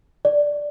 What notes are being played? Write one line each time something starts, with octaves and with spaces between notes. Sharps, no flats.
D5